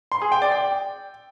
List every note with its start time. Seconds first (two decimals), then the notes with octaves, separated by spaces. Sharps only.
0.12 C6
0.22 G#4
0.32 G5
0.42 D5
0.52 G5